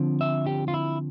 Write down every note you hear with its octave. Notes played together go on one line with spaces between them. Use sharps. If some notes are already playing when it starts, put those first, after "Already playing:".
Already playing: D3 F3 C4
E5
G4
F4
E4